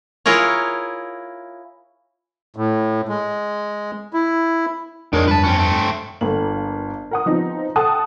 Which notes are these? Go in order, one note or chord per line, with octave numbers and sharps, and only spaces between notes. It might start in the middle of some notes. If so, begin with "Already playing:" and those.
E4 F4 G#4 A#4 C#5
A2
G#3
E4
F2 D#3 G#3 D4 A#4 C#5
G2 B4 A5
C4 C#4
A3 C4
G1 A#3 F#7
A#4 F#5 D#6
F3 B3 C4 D#4
A4 F#5 G5 A5 D#6 F#6